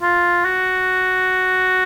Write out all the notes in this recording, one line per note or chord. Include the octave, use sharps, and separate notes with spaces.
F4
F#4